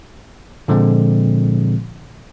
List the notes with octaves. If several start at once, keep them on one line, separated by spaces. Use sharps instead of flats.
A#2 D3 F3 G#3 C4